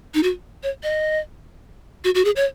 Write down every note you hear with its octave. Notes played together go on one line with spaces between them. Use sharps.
D#4
F#4
C#5
D#5
F#4
F#4
G#4
C#5